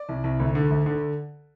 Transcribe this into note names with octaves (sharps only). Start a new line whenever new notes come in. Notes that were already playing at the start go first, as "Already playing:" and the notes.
Already playing: D5
C2
C2
D2
D3
D2
D3